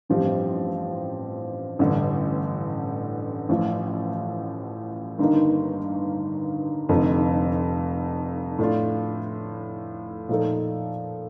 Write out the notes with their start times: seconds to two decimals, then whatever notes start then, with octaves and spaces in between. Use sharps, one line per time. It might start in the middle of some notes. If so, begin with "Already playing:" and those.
0.09 A1 G2 F3 C4 G4
1.79 A1 G2 D3
3.49 A1 A2 F3
5.19 G1 G2 D#3 A#3 D#4
6.89 F1 F2 D3 A3 D#4
8.59 A2 A3 D4 F4
10.29 A#2 F3 A3 D#4 A4